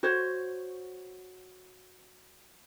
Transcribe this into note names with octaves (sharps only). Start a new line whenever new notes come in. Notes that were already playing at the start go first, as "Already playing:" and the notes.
F#4 C5 C#5